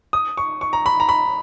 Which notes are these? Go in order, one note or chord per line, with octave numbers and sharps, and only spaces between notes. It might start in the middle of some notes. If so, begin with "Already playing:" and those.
D#6
C#6
C#6
A#5
B5
A#5
B5